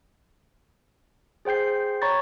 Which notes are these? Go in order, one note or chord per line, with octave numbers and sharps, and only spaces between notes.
G#4 C5 G5 G6 C7
C#5 A#5 B5 C#6 A6